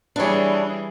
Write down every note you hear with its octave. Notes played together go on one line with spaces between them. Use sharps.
E3 G3 D4 G#4 C#5